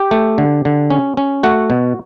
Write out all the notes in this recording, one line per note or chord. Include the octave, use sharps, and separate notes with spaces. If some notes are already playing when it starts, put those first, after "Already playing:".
Already playing: G4 G5
A3
D3
D3
C#4
C#4
A3 F#4 F#5
B2